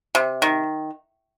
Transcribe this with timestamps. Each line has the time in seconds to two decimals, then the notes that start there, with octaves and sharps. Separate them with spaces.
0.15 C3
0.42 D#3